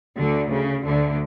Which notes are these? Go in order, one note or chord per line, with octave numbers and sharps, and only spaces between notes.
D2 D3
C#3
D2 D3